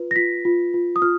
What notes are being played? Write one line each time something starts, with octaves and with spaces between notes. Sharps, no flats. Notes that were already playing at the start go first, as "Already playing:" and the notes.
Already playing: F4 B4
A#6
F4 B6
F4
F4
D#6
F4 F6